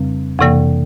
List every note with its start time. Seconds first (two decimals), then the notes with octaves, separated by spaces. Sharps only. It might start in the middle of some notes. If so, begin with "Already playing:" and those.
Already playing: F2 C#3 G3 C4
0.39 F2 C3 E3 A#3